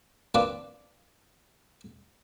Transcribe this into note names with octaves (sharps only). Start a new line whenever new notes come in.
F3 A#3 C4 D4 B4 D6